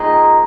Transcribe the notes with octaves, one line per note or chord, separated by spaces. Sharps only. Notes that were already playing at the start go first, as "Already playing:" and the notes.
Already playing: A#2 G#3 C4 D#4